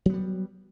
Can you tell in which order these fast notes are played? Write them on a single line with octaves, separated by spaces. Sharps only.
F#3 B3 G3